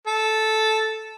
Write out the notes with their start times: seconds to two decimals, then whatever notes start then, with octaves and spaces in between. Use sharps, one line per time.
0.07 A4